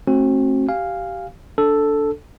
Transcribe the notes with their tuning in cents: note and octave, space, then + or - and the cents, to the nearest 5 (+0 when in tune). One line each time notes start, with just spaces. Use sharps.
A3 +0 C4 +40 F#4 +0
G4 -20 F5 +0 G#5 -20
D4 -10 A4 +0